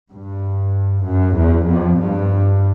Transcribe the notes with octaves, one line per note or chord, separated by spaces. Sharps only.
G2
F#2
E2
F2
G2